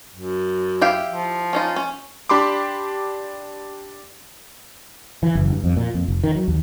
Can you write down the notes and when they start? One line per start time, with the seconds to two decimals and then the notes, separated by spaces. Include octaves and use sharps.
0.14 F#2
0.81 E4 G4 F5
1.08 F3
1.53 C#4 D#4 F4
1.76 C#4
2.29 D4 G4 B5 C6 D6
5.23 E3
5.35 F#1
5.52 G2
5.64 F2
5.77 A#2
5.94 F2
6.08 F1
6.24 D#3
6.35 F#3
6.48 D#2